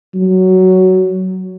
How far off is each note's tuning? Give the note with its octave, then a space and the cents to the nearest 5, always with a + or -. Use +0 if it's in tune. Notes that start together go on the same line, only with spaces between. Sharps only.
F#3 +10